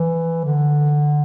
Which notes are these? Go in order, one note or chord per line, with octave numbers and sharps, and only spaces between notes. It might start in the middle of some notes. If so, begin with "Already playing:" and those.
Already playing: E3
D3